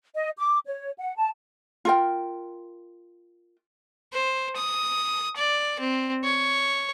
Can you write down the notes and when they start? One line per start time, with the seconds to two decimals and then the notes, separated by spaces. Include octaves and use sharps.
0.15 D#5
0.38 D6
0.67 C#5
0.99 F#5
1.17 A5
1.85 F4 A#4 G5
4.13 C5
4.56 D#6
5.37 D5
5.80 C4
6.24 C#5